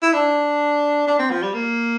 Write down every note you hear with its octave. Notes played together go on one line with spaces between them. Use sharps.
E4
D4
D4
C4
F3
G3
A#3